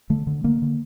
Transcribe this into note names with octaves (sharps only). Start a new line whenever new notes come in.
D3 A3
D3
D3 A#3
D3